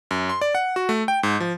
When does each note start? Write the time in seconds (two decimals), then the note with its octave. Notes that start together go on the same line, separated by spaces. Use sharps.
0.11 F#2
0.29 C6
0.41 D5
0.55 F#5
0.76 F#4
0.89 A3
1.08 G5
1.23 G#2
1.40 F3